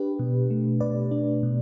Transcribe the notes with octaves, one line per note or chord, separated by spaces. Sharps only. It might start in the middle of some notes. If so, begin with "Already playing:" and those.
Already playing: D4 G4 B4
B2
A3
B2 B4 D5
D4
B2